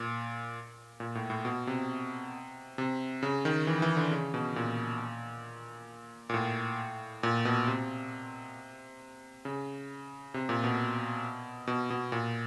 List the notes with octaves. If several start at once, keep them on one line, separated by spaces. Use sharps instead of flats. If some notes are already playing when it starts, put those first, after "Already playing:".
Already playing: A#2
A#2
A2
A2
B2
C3
C3
C#3
D#3
E3
E3
D3
C#3
B2
A#2
A#2
A2
A#2
B2
C3
C#3
C3
A#2
B2
B2
B2
A#2